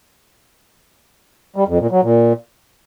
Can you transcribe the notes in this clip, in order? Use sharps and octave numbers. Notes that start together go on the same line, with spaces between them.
G3
F2
A#2
F#3
A#2